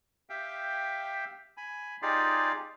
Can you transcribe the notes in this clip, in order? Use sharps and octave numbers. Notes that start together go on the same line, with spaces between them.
G4 E5 F5 G5
G#5 B5
D#4 F4 G4 G#4 D5 F5